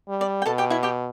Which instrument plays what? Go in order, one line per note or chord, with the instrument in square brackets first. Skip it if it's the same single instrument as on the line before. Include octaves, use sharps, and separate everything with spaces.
[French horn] G3
[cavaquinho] D5
G5
[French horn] B2 [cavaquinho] A4 A5
[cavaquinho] G4 G5
E4 E5
G4 G5